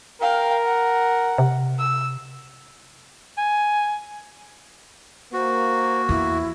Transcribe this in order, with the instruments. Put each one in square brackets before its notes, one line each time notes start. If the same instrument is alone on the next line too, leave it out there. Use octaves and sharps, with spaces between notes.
[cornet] A#4 [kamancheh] F5 G5
[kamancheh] F#5
[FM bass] C3
[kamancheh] E6
[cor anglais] G#5
[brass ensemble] A#3 [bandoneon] F#4 [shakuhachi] C5
[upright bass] E2 [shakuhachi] E4